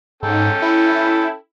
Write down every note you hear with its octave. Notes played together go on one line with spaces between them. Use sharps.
G#2 C#4 A4 G5
E4